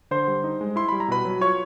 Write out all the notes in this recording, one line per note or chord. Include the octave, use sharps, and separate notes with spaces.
D3 C5 C6
G3
D#4
G#3
E4 C6
G3 B5
A#5
B2 B4 B5
F#3
F4 C#5 C#6